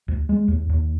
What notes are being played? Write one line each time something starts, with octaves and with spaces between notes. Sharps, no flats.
D2
G#3
D#2
D#2